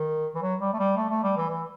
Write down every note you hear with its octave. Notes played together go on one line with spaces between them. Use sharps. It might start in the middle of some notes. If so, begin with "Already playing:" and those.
Already playing: D#3
E3
F#3
G3
A3
G3
A3
A3
G3
E3
E3